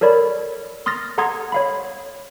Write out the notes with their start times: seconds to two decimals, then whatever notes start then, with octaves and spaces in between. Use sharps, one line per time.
0.01 A4 A#4 C#5 D5 B5
0.86 C6 D#6 F6 A6 A#6
1.18 A4 F#5 A#5 C6 D#6 G#6
1.52 C#5 F5 B5